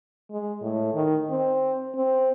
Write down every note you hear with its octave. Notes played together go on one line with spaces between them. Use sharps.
G#3
A2
D#3
C4
C4